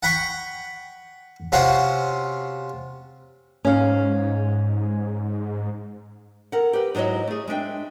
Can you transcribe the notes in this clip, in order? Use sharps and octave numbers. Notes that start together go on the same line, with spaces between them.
F#5 G5 B5 C#6
C3 C#4 F4 F#4 C5 F#5
G#2 C#4 F5
A4 A#4 F#5
G4 B4
G#2 F#3 E4 C#5 D#5
A3 G#4
G#3 D4 E5 G5